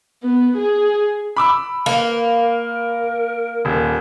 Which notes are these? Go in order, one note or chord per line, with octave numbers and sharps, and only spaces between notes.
B3
G#4
B5 D6 E6
A#3 B4
A#4
D#1